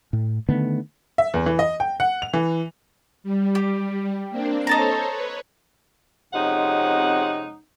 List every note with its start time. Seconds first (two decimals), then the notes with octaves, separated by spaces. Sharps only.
0.13 A2
0.49 D3 D#3 A3 B3
1.18 E5
1.34 E2
1.46 E3
1.59 D#5
1.80 G5
2.00 F#5
2.22 F7
2.33 E3
3.24 G3
3.55 G4
4.30 A#3 C4 D4
4.67 A4 C5 C#5 D#5 A5 A#5
5.09 B4 C#5
6.34 F2 C3 G#3 C#4 D#4 F#5